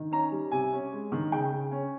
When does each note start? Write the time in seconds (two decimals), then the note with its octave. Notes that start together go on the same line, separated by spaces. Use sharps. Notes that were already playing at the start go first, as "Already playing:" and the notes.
Already playing: D#3
0.12 C#4 A#5
0.32 G3
0.51 C3 G#5
0.72 C#4
0.92 G#3
1.12 D#3
1.32 C#3 G5
1.52 C#3
1.71 C#4